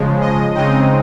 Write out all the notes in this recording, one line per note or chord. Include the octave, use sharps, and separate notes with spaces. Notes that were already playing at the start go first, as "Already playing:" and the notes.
Already playing: C#3 F3 G#3
D#5
C#3 G#3 C4 D#4 D#5